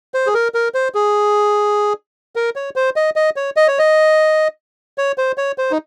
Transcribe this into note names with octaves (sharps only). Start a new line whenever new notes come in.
C5
G#4
A#4
A#4
C5
G#4
A#4
C#5
C5
D#5
D#5
C#5
D#5
C#5
D#5
C#5
C5
C#5
C5
D#4